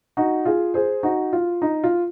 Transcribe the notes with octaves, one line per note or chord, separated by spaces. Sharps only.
D#4 F#4
F4 G#4
G#4 C5
D#4 F#4
F4
D#4
F4